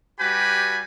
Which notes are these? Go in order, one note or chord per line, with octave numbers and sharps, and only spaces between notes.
G3 F#4 G4 B4 G#5 B5